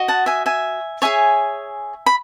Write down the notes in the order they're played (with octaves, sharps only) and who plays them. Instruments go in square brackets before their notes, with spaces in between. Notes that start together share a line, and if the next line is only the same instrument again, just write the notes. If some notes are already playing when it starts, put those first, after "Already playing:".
Already playing: [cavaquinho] F#4 D#5
F#5 A5
E5 G#5
E5 G#5
G#4 C#5 E5 G#5
B5